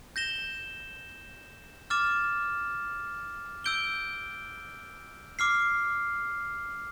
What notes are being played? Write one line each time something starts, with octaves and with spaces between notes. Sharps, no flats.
G6 A#6 E7 G7
D6 F6 A6 E7
E6 G6 D7 G7
D6 F6 C7